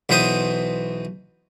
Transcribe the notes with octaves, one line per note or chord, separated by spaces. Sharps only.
B1 B2 E3 C5 C6 D#6